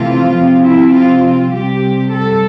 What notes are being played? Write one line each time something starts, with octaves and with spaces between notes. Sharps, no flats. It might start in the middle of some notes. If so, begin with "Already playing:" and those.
Already playing: C3 E3 A3 C4 F4
C3 F3 C4
E4
F4
F4
C3 G3 C4 G4
A4